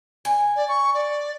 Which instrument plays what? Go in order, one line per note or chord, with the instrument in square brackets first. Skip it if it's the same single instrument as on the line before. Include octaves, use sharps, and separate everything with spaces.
[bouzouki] G#5
[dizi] D5
C#6
D5